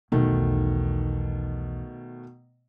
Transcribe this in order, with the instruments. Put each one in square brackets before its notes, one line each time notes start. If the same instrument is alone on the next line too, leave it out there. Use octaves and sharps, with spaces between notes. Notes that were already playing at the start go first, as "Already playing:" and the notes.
[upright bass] B1 E2 [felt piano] B2 D#3 A3